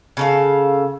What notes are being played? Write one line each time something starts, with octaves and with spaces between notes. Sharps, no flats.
C#3 A4 F5